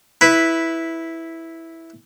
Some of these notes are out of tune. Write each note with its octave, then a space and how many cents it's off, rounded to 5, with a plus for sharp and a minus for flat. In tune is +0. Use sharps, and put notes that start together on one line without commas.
E4 -5 B4 +0